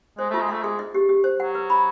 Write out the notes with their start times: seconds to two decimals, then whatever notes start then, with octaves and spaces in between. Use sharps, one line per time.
0.18 G#3 C5
0.30 A3 F4
0.41 G#3
0.49 A3 E5
0.62 G#3 G#4
0.79 D#5
0.94 G4
1.09 G4
1.24 C5
1.39 F#3 F#5
1.55 B4
1.70 B5